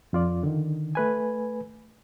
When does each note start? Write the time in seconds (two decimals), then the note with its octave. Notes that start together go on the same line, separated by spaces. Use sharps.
0.13 F2 F4 D5
0.43 D3 D#3
0.95 A3 B4 G#5